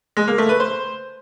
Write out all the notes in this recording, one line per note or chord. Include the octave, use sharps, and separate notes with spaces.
G#3
A#3
A3
B4
C5